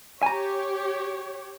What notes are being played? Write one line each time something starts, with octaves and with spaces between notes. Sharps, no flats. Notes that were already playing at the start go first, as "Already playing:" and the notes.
G4 C#5 G#5 A#5